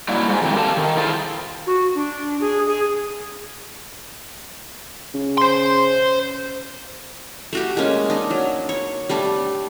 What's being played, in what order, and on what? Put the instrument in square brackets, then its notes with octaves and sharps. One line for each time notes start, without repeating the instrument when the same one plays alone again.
[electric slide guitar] F#3 G3 A#3 E4
G#2
F2 D#3 C4
G4 A4 A#4 F5 A5
D#3
E4 F4 G#4 A4 C5
[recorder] F#4
D4
G#4
G#4
[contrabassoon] C#3
[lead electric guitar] C5 C6
[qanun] A3 F#4 G4
G#3 A#3 C#4
D4 D#4
F#3
C#5
G3 A3 D4